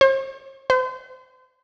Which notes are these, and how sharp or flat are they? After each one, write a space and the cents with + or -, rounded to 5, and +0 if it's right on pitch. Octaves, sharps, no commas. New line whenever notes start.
C5 +45
C5 -35